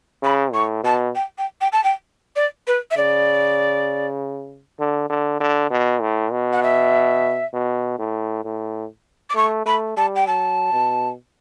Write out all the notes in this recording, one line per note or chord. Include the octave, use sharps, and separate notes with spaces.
C#3 B5
A2 C#6
B2 A5
G5
G5
G5
A5
G5
D5
B4
E5
C#3 D5
D3
D3
D3
B2
A2
B2
F#5
E5
B2
A2
A2
D6
A3 C#6
A3 B5
G3 A5
G5
F#3 A5
B2